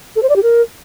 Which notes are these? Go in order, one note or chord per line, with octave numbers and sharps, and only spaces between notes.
A4
C5
D5
G4
A#4